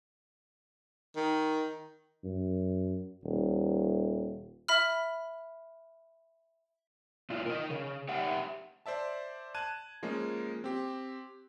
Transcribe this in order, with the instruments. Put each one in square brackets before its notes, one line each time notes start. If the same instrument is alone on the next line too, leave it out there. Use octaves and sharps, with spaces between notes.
[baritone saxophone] D#3
[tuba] F#2
D#1
[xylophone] E5 B5 F6
[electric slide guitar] A#2 E4 F4
A#4 D#5
C#3
G4 E5 F#5
[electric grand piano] C5 D5 E5 A5
A5 F#6 G#6 D#7
F3 G#3 A#3 C#4
C4 G4